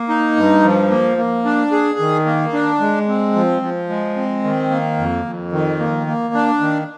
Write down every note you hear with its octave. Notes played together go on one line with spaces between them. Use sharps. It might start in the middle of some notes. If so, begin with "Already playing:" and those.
Already playing: A#3
D#4
G2
F3
A#3
A#3
D4
G#4
D#3
A#3
D4
G#3
C4
F3
F3
G#3
C4
D#3
A#3
F2
F2
D#3
A#3
A#3
D4
D#3